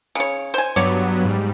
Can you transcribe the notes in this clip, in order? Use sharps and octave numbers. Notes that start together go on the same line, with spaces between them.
C#3 C#5
C5 G#5
G2 F#3 B3 C#5 D5
G#2 G3